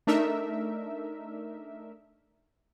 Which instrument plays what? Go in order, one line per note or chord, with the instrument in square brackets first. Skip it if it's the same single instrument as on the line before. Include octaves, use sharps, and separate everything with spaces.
[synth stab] A3 D4 D#4 A#4 E5